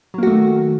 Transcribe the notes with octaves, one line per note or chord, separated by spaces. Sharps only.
D#3 F#3 A3 A#3 F#4